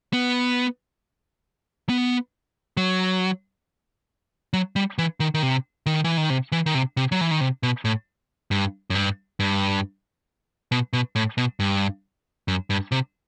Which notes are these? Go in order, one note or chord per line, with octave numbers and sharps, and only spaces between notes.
B3
B3
F#3
F#3
G3
E3
D#3
D#3
C3
D#3
E3
D#3
C3
E3
D#3
C3
C3
F#3
E3
D#3
C3
B2
A2
G2
F#2
G2
G2
B2
B2
A2
B2
G2
F#2
G2
C3